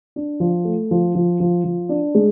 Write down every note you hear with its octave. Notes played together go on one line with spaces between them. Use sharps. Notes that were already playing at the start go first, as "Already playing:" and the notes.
D4
F3
A3
F3
F3
F3
F3
D4
G#3